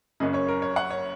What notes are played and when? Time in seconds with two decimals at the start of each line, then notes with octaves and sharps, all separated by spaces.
0.20 F#1 F#2 C#3 D#5
0.34 C#5
0.49 A#4
0.62 C#5
0.76 F#5
0.90 C#5